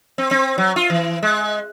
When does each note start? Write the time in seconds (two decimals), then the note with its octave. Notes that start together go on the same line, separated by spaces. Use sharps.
0.18 C4
0.31 C4
0.58 F#3
0.76 F4
0.90 E3
1.23 G#3